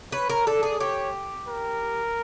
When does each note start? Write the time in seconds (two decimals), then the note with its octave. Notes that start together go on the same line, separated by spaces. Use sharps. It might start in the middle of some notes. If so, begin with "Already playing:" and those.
0.12 B4 C#5
0.30 A#4
0.46 A4 D5
0.63 G#4
0.80 G4 C#5
1.48 A#4